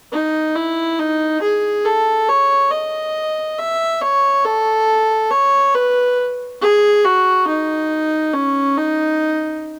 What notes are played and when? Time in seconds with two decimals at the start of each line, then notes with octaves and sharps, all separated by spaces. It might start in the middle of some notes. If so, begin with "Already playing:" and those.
0.12 D#4
0.55 E4
0.99 D#4
1.42 G#4
1.85 A4
2.28 C#5
2.71 D#5
3.58 E5
4.01 C#5
4.45 A4
5.31 C#5
5.75 B4
6.61 G#4
7.04 F#4
7.47 D#4
8.34 C#4
8.77 D#4